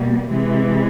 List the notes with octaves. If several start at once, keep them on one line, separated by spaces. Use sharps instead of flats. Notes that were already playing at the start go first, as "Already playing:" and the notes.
Already playing: B2 G3 A#3
C3 E3 G#3